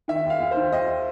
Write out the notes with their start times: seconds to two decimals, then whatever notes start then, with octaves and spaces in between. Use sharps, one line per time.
0.08 D#3 E5
0.25 D#2
0.30 F5
0.40 D#2
0.51 C5
0.57 D#3
0.72 D#2 D#5